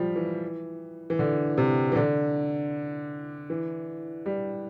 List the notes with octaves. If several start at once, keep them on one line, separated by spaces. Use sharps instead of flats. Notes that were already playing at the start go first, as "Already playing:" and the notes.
Already playing: F3 G3
E3
E3
D3
C3
E3
D3
E3
G3